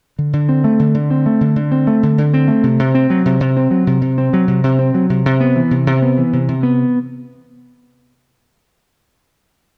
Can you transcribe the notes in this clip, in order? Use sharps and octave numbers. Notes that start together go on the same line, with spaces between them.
D3
D3
C4
A3
D3
D3
C4
A3
D3
D3
C4
A3
D3
D3
C4
A3
C3
C3
C4
F#3
C3
C3
C4
F#3
C3
C3
C4
F#3
C3
C3
C4
F#3
C3
C3
B3
E3
C3
C3
B3
E3
C3
C3
B3